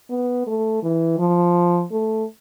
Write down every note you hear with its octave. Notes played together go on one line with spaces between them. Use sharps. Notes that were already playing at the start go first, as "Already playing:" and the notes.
B3
A3
E3
F3
A3